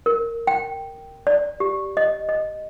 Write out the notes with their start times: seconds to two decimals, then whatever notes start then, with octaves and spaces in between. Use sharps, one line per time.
0.06 A#4
0.47 G5
1.27 D5
1.60 G4
1.97 D#5
2.29 D#5